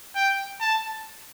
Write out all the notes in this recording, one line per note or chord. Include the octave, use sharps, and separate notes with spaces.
G5
A5